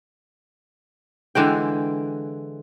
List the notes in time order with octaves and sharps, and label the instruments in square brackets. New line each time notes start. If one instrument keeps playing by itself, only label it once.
[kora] D3 E3 G#3 G5